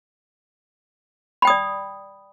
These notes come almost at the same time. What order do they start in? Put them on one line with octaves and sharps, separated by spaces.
B5 G5 D#6 D5